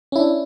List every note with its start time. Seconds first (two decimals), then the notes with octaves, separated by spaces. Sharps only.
0.12 C#4
0.16 E4
0.19 D4